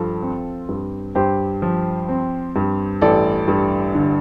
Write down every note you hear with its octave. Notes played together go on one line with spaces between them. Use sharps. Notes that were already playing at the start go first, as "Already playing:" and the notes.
Already playing: G2 F3 F4 A4
C4
G2
G2 G4 C5
F3
C4
G2
A1 A4 D5
G2
D3